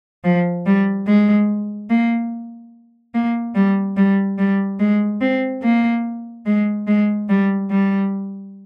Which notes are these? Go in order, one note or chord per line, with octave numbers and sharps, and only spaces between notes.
F3
G3
G#3
A#3
A#3
G3
G3
G3
G#3
C4
A#3
G#3
G#3
G3
G3